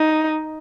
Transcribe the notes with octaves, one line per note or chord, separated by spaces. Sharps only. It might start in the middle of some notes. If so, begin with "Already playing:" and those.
Already playing: D#4